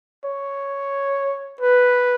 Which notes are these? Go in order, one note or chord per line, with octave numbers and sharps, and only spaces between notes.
C#5
B4